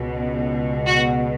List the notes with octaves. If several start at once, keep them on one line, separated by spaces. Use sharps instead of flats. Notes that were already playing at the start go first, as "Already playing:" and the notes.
Already playing: C#2 B2
F#4